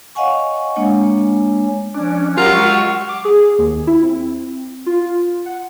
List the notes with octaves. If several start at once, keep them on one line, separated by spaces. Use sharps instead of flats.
C#5 D#5 F5 F#5 G#5 C#6
G#3 A#3 D4 C#5 G#5
F3 C#4 D4
F#3 F4 G4 A#4 F#5
G#3 C#6
E6
D6
G#4
D#2
E4
C4
F4
F#5